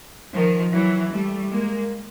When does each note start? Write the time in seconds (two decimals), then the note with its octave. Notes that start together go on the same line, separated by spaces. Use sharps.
0.32 D#3 F3
0.72 E3 F#3
1.11 G3 A3
1.51 G#3 A#3